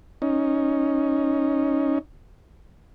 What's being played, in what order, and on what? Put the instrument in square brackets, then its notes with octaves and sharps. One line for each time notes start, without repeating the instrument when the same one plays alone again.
[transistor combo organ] C#4 D#4